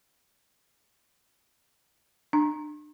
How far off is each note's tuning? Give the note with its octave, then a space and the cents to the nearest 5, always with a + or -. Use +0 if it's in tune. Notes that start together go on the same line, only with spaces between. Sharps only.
D4 +35 A#5 +0